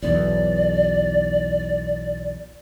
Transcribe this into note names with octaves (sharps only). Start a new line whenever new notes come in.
B1 E2 D5